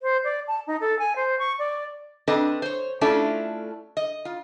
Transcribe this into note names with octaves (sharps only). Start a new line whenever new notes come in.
C5
D5
A5
D#4
A4
G#5
C5
C#6
D5
C4 D4 A4 B4 D#5
C5 C#5
A3 C#4 D4 E4 F4 A4
D#5
F4